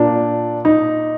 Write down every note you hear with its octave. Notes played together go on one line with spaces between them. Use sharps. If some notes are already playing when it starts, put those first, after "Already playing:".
Already playing: A#2 D4
D#4